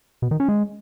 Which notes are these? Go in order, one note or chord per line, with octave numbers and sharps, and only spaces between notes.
B2
D#3
C#4
G#3